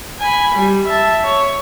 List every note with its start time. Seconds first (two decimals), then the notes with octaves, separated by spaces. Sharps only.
0.20 G#5 B5
0.55 G3
0.87 E5 A5
1.24 C#5